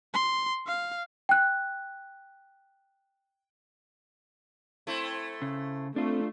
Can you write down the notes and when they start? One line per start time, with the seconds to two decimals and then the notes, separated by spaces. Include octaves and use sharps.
0.14 C6
0.67 F5
1.29 G5 F#6
4.87 A3 C4 E4
5.42 C#3
5.96 A3 C4 D4 F4